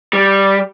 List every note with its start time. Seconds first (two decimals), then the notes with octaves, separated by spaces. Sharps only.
0.13 G3